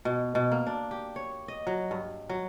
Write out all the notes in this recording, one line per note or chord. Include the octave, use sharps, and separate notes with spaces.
B2
B2
A#3
D4
G4
C#5
D#5
F#3
G2
F#3